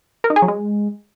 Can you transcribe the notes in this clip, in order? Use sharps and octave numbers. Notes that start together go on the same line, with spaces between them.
A#4
D#4
G#4
F#3
G#3